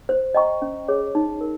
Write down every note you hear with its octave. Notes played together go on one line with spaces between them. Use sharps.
C5
D#5 G5 A#5 C#6
C#4
G#4 C#5
D#4
A#4